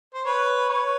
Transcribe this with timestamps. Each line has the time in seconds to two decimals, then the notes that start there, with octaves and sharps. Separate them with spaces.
0.14 C5
0.25 B4 C#5
0.69 B4 C#5